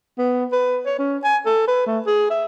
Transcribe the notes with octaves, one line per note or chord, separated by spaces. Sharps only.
B3
B4
C#5
C#4
G#5
A4
B4
A3
G#4
E5